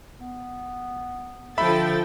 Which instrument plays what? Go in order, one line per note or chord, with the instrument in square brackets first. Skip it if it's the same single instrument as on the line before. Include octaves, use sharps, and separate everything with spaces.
[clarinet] B3
[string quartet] D3 F3 A6 [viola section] A4 G5 [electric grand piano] E5 B5